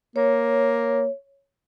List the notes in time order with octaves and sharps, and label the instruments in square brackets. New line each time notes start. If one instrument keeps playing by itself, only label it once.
[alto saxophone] A#3 [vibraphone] C#5